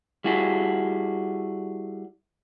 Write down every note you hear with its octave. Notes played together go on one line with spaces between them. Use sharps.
G3 E4 F#4 G#4 A4